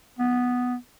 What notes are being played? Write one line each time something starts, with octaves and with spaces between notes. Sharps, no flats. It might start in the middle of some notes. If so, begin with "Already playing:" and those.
B3